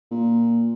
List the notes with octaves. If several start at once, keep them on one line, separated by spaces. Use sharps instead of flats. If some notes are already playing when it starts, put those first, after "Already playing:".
A#2